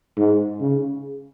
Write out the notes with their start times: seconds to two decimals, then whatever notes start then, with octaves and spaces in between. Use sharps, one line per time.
0.17 G#2
0.60 C#3